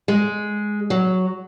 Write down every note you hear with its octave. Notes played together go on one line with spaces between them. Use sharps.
G#3
F#3